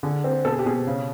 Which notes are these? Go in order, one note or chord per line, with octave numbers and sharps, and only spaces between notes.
D3 G#4
C4
B2 A4
G#4
G4
B2 G#4
C#3